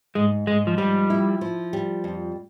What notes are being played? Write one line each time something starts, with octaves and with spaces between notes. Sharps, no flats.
G#2 G#3
G#2 G#3
F3
F3 G3
E4
F3
G3
F2